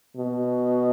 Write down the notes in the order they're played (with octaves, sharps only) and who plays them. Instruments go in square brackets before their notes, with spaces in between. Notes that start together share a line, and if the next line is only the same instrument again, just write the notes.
[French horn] B2